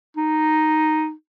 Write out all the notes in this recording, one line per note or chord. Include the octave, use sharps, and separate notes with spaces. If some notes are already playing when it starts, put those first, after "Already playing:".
D#4